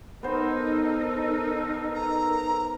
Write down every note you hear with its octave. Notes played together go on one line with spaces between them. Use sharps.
B3 D#4 A4 A#4 C5
A#5